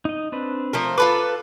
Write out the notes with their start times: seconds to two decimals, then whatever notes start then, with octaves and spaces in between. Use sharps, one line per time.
0.05 D#4 D#5
0.32 C4 D4 B4
0.73 F3 A3 A#4
0.98 F4 A4 B4 D6